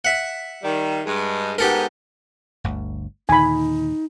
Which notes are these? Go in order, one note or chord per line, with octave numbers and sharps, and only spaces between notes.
E5 F#5
D#3 G3
G2 G#3
G#2 B3 G4 A4 A#4
G1 D2
D#2 A#2 D3 D#4 G#5 B5